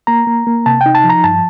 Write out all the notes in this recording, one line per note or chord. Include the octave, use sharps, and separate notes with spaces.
A#3 A#5
A#3
A#3
C3 A5
G5
D#4
A5
F3
A#5
G2 A5